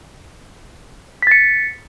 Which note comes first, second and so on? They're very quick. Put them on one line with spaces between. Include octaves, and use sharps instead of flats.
B6 A6 C#7